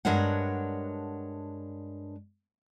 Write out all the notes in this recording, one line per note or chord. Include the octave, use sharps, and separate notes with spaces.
G2 G#3 D4 A#4 C#5 F#5